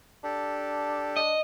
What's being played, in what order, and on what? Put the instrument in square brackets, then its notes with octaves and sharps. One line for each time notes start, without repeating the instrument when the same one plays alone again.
[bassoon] D4 [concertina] G4 A4
[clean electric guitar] D#5